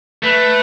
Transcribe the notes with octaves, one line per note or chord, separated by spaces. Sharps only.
A3 B4